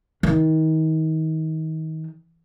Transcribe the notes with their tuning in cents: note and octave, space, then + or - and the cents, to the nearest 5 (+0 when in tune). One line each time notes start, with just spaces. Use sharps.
D#3 +30